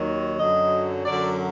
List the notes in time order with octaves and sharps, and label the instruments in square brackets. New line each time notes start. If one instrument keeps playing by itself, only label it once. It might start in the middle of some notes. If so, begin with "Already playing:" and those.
Already playing: [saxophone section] D#2 D#3 F#3
F#2 D3 F#3 D#5
F#2 D3 F#3 D5